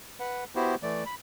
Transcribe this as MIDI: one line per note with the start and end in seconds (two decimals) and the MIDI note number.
0.20 0.44 71
0.20 0.44 78
0.56 0.75 59
0.56 0.75 64
0.56 0.75 66
0.56 0.75 67
0.56 0.75 72
0.83 1.04 52
0.83 1.04 57
0.83 1.04 74
1.06 1.15 83